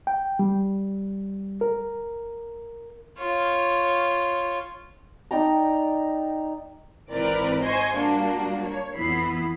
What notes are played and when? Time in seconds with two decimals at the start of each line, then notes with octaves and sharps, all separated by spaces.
0.07 G5
0.39 G3
1.61 A#4
3.20 F4 C#5
5.31 D#4 D5 G5 A#5
7.11 G#1 E3 C4 A#4 B4 D5
7.62 C5 D#5 G#5 C6 C#6
7.95 G3 A#3 D4 F#4
8.66 C#5
8.97 F2 E3 B3 E4 B5 C7